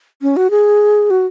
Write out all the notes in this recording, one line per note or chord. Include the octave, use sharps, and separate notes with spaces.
C#4
F#4
G#4
F#4